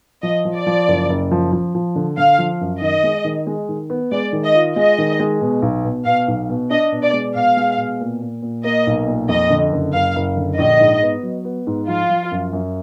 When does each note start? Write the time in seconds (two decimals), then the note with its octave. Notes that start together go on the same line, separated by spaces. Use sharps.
0.23 F3 D#5
0.45 F3
0.56 D5
0.67 F3
0.88 F#1
1.09 F#1
1.31 F3
1.52 F3
1.75 F3
1.96 D3
2.17 D3 F5
2.38 F3
2.61 F#2
2.81 D#3 D#5
3.03 G#3
3.24 D#3
3.47 G#3
3.69 D#3
3.90 B3
4.12 G#3 D5
4.33 D#3
4.44 D#5
4.55 F4
4.76 G#3 D#5
4.98 D#3
5.19 G#3
5.41 B2
5.62 B1
5.84 B2
6.05 B2 F5
6.28 B1
6.49 B2
6.70 D4 D#5
6.92 B2
7.03 D5
7.13 G#3
7.35 B2 F5
7.57 G#3
7.78 B2
8.00 A#2
8.22 A#2
8.42 A#2
8.64 A#3 D#5
8.87 B1
9.07 A#2
9.29 F2 D#5
9.50 D3
9.72 F#1
9.93 F#1 F5
10.16 F#1
10.37 D3
10.58 A#1 D#5
10.80 G#2
11.02 B3
11.23 F#3
11.45 B3
11.67 G#2
11.88 F3 F4
12.10 F3
12.31 F#2
12.53 F#2